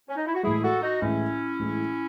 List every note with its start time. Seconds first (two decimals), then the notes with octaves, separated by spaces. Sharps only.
0.08 C#4
0.16 D#4
0.26 E4
0.34 F#4
0.43 A2 E3 G#3 E4 G#4
0.63 F#4 A4
0.82 D#4 F#4
1.02 A2 E3 G#3 C#4 E4
1.60 A2 E3 G#3